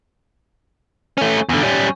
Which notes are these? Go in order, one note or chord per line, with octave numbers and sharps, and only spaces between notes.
A3 C#4
E2 D3
G3 C#4